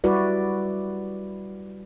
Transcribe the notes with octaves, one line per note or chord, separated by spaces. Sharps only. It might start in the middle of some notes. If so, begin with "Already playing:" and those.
G3 E4 F#4 B4 D5